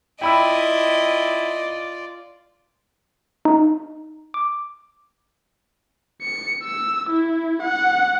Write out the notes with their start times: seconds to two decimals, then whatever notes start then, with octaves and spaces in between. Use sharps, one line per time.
0.21 E4 F4 D5 D#5 G5 B5 E6
3.45 D#4
4.34 D6
6.22 C#7
6.63 E6
7.09 E4
7.62 F#5